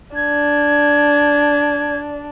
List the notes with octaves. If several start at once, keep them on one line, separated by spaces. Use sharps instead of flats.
D4 G#6